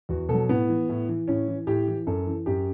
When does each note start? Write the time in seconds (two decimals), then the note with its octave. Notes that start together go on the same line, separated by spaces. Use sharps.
0.09 E2 F#4
0.29 B2 A4
0.34 F#3
0.49 A2 B3
0.69 E3
0.89 A2
1.09 E3
1.28 A2 C#4
1.48 E3
1.67 A2 G4
1.88 E3
2.07 F#2 A4
2.27 E3
2.46 F#2 G4